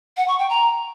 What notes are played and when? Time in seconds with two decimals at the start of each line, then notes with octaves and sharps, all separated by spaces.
0.17 F#5
0.28 C#6
0.39 G5
0.50 A#5